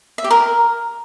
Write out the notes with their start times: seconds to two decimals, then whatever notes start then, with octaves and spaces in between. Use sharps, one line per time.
0.18 E5
0.24 G4
0.31 A#4